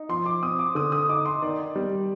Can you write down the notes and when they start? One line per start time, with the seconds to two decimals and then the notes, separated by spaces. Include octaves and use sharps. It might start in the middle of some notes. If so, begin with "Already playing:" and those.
Already playing: D#4
0.09 F3 C6
0.26 D6
0.42 C4 D#6
0.59 D6
0.75 D3 D#6
0.92 D#6
1.09 D#4 D6
1.26 C6
1.42 D#3 D5
1.76 G3